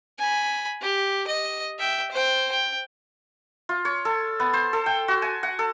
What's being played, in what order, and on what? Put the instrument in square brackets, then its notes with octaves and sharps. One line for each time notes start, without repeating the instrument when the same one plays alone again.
[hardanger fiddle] G#5 B5
G4
D#5
E5 G5
C5 G5
G5
[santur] F4
C#5
A4
B3
C5
A4
G5
F#4
G#5
F#5
A4